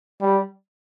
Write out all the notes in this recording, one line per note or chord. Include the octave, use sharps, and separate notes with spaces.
G3